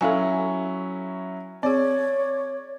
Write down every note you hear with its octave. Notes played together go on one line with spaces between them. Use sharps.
F#3 C#4 E4 A4 F5 G#5
C4 G#4 C#5 D5